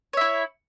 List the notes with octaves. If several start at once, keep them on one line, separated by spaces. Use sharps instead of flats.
E4 C#5 E5